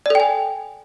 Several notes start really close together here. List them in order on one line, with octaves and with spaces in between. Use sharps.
D5 A4 G5 G#5